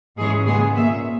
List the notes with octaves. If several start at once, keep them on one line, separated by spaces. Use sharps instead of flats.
G#2 E3 G#3 C#4 G#4
D#2 C#3 G#3 B3 G#4
A#2 A#3 C#4 E5